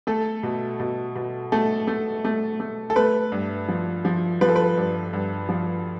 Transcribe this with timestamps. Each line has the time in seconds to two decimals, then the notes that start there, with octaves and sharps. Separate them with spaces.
0.07 A3 A4
0.43 B2
0.80 B2
1.16 B2
1.52 A3 A4
1.87 A3
2.25 A3
2.60 A3
2.90 A4
2.96 A3 B4
3.32 G2
3.68 F3
4.05 F3
4.41 F3 B4
4.49 A4
4.56 B4
4.77 G2
5.13 G2
5.49 F3